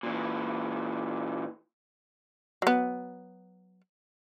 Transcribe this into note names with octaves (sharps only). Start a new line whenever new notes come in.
A#2 E3
F#3 B3